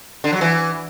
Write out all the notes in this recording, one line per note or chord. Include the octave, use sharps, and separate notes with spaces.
D3
F#3
E3